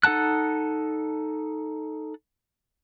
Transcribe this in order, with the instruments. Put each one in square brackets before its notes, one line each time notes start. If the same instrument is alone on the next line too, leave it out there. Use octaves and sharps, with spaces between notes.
[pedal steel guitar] D#4 A4 F#5 A5 F#6